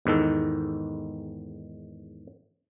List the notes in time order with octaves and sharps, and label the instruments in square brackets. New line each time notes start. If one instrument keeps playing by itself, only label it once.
[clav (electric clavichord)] E2 G#2 D#3 A4